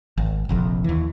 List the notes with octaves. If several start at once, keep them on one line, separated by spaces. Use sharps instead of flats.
G#1
F1 A#1 F2
D#2 E3